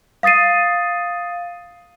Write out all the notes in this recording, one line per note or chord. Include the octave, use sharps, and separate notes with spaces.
F5 D#6 A6 C7 D#7